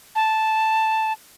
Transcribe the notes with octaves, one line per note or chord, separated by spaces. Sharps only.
A5